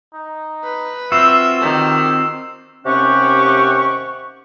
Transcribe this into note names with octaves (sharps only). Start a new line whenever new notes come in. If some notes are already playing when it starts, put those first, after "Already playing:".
D#4
B4
C4 F4 F#4 E5 E6 C7 E7
D#3 G4
D#2 C3 C#4 G4 F#5 C#6